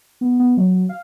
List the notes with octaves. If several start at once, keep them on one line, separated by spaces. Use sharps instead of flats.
B3
B3
F#3
F#3
F5